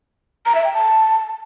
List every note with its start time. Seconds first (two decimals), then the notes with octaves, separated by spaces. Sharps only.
0.46 A#5
0.55 E5
0.64 G5
0.73 A5